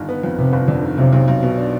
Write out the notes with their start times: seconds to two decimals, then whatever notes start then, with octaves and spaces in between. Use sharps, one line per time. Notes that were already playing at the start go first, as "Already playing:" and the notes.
Already playing: G1 D#3
0.09 B3
0.23 F2
0.38 C3 B3
0.53 G1
0.68 F2 D3
0.83 D#3
0.98 B1 C3
1.13 B1
1.28 B1
1.43 B2
1.58 D4